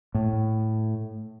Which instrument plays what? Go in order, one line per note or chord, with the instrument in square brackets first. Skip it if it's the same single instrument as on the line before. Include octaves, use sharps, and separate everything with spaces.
[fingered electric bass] A2